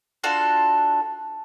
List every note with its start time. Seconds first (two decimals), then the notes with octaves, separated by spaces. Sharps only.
0.24 D4 F4 F#4 A4